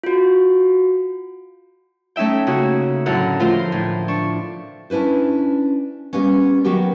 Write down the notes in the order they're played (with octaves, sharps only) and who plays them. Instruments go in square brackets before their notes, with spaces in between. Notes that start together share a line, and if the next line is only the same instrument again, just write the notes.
[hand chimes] F4 F#4
[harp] A3 C#4 D#4 E5 G5
C#3 A#3 F#4
F#2 A2 D3 A#4 F#5
F3 A3 F4 A#4 C5
A2
D4 C#6
[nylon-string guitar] C#4 D4 E4 B4 C5
G3 A#3 B3 C#4
D#3 F#3 B3 F#4 G4 A#4